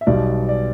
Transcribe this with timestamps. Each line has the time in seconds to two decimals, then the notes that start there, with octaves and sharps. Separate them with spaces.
0.01 E5
0.07 B1 B2 G3 D5
0.49 D5